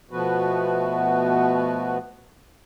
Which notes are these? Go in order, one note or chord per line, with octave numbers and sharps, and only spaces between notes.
B2 F3 A3 B3 F#4 B4